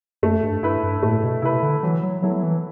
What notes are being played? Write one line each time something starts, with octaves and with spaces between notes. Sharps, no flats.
F#2 A3
G2
G2 E4 B4
G2
A2 A3
B2
C3 E4 B4
D3
E3 F#3
F#3
F#3 B3 E4 A4
F#3
E3